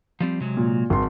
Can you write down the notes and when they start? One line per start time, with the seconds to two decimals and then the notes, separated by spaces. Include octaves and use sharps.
0.21 F3 G3 C4
0.41 C3 F#3 G#3
0.57 A#2
0.90 G#1 G2 C6